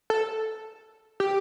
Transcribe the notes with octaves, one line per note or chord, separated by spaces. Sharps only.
A4
G4